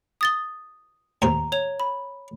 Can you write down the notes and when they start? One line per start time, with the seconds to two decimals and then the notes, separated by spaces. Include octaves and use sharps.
0.21 D#6 A6 G7
1.22 D#2 A2 C5 A#5
1.52 C#5 F7
1.80 B5